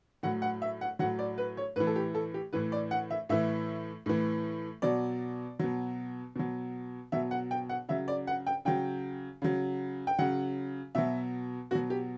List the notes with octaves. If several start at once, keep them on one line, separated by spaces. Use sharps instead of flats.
A2 F#3 F#5
F#5
E5
F#5
A2 F#3 F#5
D5
B4
C#5
A2 E3 B4
A4
G4
A4
G4
A2 E3 B4
D5
F#5
E5
A2 E3 E5
A2 E3
B2 F#3 D5
B2 F#3
B2 F#3
B2 F#3 E5
F#5
G5
F#5
C#3 F#3 E5
D5
F#5
G5
C#3 F#3 G5
C#3 F#3
G5
C#3 F#3 F#5
B2 F#3 E5
B2 F#3 F#4
G4